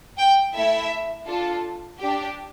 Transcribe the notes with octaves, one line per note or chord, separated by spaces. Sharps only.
G5
A3 E4 A4 E5
D4 F4 A4
D4 G4